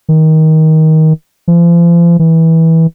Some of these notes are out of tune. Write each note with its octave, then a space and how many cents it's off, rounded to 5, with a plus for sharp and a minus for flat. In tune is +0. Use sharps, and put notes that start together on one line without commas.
D#3 +20
F3 -40
E3 -20